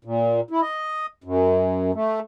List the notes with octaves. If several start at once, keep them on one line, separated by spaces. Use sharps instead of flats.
A#2
E4
D#5
F#2
A3